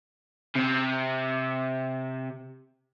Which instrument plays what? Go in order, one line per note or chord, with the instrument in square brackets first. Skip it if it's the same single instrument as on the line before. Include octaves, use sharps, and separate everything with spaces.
[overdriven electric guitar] C3 C4